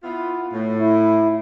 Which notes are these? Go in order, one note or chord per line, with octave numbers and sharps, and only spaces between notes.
B3 E4 F4
A2
E4